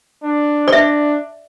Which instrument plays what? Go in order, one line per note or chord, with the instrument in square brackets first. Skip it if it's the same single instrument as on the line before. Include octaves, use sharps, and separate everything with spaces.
[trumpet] D4
[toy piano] D5
[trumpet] D4 [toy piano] E5